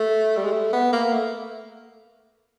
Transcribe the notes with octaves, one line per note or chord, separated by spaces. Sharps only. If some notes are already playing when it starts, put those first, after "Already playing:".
Already playing: A3
G3
G#3
A3
B3
A#3
A3